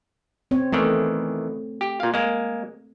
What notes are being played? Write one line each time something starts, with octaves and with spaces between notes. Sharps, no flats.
C4 C#5
E2 D#3 E3 A3
G4
A#2 F5
G#3 A#3